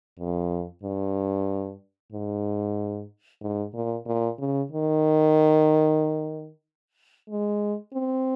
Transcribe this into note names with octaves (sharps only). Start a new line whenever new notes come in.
F2
G2
G#2
G#2
A#2
A#2
C#3
D#3
G#3
C4